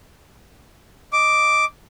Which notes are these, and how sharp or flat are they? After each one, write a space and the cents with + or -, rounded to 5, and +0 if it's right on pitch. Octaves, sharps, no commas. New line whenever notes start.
D#5 +5 D6 +0